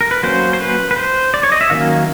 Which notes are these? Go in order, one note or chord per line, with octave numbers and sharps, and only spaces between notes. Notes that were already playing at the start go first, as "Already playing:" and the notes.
A#4
B4
F#3 A#3 C#4 C5
C5
B4
B4
C5
D5
C#5
D#5
E5
D#3 F#3 A#3 C#4 F5